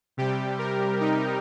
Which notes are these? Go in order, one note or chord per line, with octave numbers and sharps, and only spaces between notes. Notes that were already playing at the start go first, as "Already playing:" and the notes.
C3 G3 G4
A#4
D#4